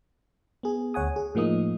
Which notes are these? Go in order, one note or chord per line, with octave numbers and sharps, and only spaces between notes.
B3 G#4
D2 C#5 F#5 G#5 D#6
G#4
A2 F3 A#3 D#4 D#6